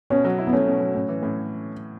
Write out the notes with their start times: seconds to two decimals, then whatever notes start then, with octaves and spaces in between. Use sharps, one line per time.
0.10 B2 C#4
0.25 F#3
0.38 E4
0.47 B3
0.53 A3 C#4
0.67 B2
0.81 F#3
0.94 A2
1.09 E3
1.23 A2